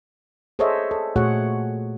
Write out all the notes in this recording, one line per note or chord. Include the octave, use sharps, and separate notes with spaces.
G#4 A4 C5 C#5 D#5 E5
A4
A#2 A3 F#4 G#4 C#5 F#5